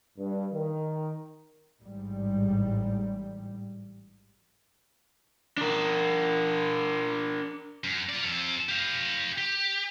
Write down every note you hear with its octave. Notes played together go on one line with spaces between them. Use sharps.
G2
D#3
A1 G#2 G3
D4 A#4
F#2
F4 D5
F2 A4
G4 F5
G4